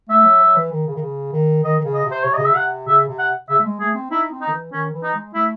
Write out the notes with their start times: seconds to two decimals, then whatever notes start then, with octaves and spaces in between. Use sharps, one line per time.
0.09 A3 E5
0.24 F#3
0.41 F#3
0.56 E3
0.72 D#3
0.87 C#3
0.96 D#3
1.02 C#3
1.33 D#3
1.63 D#3 D#5
1.80 D#3
1.84 C#3
1.94 D#5
2.05 C3
2.11 C5
2.23 C3 C#5
2.34 C#3 D#5
2.45 E5
2.53 C3 F#5
2.88 C#3 E5
3.08 C3
3.19 F#5
3.49 C#3 E5
3.59 A3
3.65 G#3
3.80 A3 G#4
3.95 C4
4.11 D#4 E4
4.32 C4
4.41 D#4
4.47 D#3
4.52 E3
4.73 D#3 C#4
4.93 E3
5.04 D#4
5.14 G#3
5.34 A3 E4